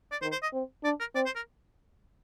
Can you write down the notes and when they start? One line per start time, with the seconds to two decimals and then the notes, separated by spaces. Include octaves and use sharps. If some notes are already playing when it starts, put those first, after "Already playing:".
0.11 D5
0.22 D#3 C5
0.32 C5
0.43 D#5
0.53 C4
0.83 D4 D5
1.00 A#4
1.15 C4 D5
1.26 C5
1.36 A#4